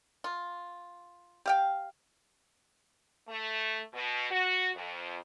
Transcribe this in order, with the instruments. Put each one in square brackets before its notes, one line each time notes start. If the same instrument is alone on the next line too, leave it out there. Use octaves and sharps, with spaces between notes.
[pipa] F4
G4 F5 G5
[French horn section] A3
B2
F#4
F2